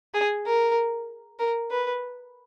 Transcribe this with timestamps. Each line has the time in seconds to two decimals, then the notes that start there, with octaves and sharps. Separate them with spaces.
0.14 G#4
0.46 A#4
1.39 A#4
1.70 B4